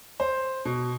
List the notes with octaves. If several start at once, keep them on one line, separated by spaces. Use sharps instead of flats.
C5
B2